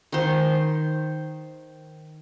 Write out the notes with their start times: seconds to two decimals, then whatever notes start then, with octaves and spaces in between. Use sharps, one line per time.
0.12 D#3 C5